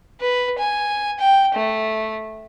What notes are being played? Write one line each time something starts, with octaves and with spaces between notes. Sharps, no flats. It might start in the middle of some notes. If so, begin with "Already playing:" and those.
B4
G#5
G5
A3